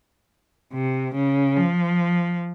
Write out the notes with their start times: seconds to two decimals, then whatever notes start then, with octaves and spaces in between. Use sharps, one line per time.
0.73 C3
1.15 C#3
1.56 F3